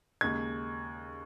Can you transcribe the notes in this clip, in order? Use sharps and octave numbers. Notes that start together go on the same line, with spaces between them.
D#2 C#3 G#3 G#6